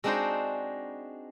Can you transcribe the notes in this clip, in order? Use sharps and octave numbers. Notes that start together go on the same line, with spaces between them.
G#3 C4 D4 D#4 F#4 C5